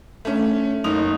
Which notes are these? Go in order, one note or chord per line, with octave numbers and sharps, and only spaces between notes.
A3 C#4
F#1 D#4 D#6 F7